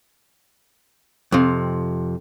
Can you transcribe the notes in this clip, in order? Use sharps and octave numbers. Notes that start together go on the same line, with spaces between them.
F2 C3